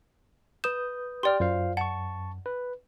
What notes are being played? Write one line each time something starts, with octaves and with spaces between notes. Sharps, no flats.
B4 D#6 G6 E7
G4 D5 G5 C6 F6
F#2 F4 C5 F5
F#5 A5 C#6
B4